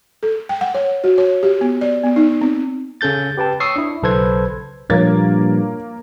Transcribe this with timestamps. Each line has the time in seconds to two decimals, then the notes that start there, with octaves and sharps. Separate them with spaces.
0.23 A4
0.49 G5
0.61 F#5
0.75 C#5
1.04 F#4
1.18 C#5
1.43 G4
1.61 B3
1.81 D5
2.04 B3
2.16 D#4
2.41 C4
3.01 C#3 C#4 A4 G6 A6
3.37 G4 B4 G5 A5
3.60 C#5 C#6 D#6 E6 C7
3.76 D4 E4
4.03 B1 C#3 A4 B4 C5 G#6
4.90 G2 A#2 F3 A#3 C#5 G#6 A6